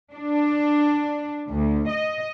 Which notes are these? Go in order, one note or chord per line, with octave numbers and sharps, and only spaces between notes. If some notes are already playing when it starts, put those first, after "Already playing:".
D4
D2
D#5